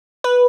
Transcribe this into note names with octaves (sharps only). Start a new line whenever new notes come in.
B4